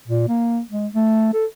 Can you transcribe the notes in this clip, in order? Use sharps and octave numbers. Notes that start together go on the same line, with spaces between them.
A#2
A#3
G#3
A3
A4